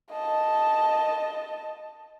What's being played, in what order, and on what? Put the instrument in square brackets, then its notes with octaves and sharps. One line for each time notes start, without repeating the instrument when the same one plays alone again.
[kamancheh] D#5 A5